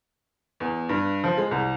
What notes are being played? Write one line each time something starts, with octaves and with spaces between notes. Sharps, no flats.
E2
G2
F3
G#3
C2